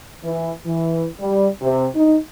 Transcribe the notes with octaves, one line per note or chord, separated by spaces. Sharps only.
E3
E3
G3
C3
D#4